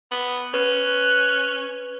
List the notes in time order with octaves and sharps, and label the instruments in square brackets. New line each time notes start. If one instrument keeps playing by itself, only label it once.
[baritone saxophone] B3
[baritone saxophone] C#4 [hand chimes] B4 [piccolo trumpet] F#6